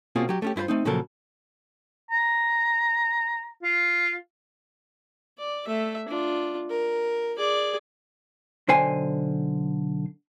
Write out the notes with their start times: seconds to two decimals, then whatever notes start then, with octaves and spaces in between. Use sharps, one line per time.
0.16 B2 A#3 C4 C#4 F4 G#4
0.29 F#3 G4
0.42 A3 C#4 G4
0.56 G2 E4 F4 C5 B5
0.68 A3 C4 D#4
0.85 A#2 C#3 F3 F#3 A4 A#4
2.11 A#5
3.63 F4
5.39 D5
5.67 A3 E5
6.08 D4 F4
6.70 A#4
7.38 G#4 D5
8.68 B1 D3 C5 G5 G#5